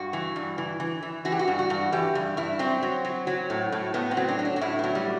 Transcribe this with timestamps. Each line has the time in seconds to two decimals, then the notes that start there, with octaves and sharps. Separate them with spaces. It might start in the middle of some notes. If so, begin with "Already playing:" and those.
Already playing: G2 F#4
0.13 E3
0.36 G2
0.58 E3
0.80 E3
1.03 E3
1.25 E3 F#4
1.32 G4
1.39 F#4
1.48 G2
1.59 F#4
1.70 G2
1.92 E3 G4
2.15 G2
2.37 G2 E4
2.59 F#3 C4
2.83 F#3
3.05 F#3
3.27 F#3
3.50 A2
3.72 A2
3.94 A2 B3
4.11 C4
4.17 F#3
4.29 D4
4.39 F#3
4.45 D4
4.56 F#4
4.61 A2 E4
4.79 F#3 B3
4.95 G3